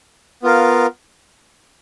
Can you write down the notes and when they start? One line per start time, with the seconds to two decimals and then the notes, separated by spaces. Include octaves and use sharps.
0.43 B3 F4 A#4 F5